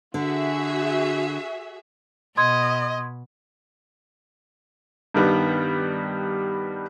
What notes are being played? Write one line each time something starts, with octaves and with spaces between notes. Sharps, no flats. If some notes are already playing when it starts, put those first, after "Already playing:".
D3 F#4 G#4 E5
B2 D#5 C6 D#6 G#6
G2 D#3 G3 B3